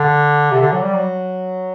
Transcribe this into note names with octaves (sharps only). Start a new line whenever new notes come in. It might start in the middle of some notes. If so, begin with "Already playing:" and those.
Already playing: D3
C3
D3
F#3
G3
F#3